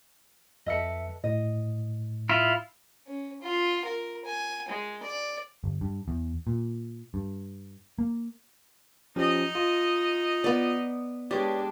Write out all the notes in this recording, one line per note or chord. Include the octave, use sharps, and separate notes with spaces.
F2 A4 B4 D#5 E5 C#7
A2 D#5
E4 F4
C#4
F4
A#4
G#5
G#3
D5
G1
G2
E2
A#2
G2
A#3
F3 C#4 D#4 G4 D#5
F4
B3 D5
G#3 D4 G4 B4 C#5 D5